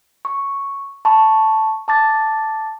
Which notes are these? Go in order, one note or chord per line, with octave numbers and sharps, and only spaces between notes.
C#6
A5 B5 C#6
A5 D6 A6